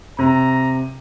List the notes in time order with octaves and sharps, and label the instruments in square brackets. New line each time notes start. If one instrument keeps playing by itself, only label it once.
[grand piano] C3 [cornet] A#5